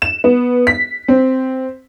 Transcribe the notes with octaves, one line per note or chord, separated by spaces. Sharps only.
E7
B3
B6
C4